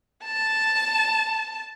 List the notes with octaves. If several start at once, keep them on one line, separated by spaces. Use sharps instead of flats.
A5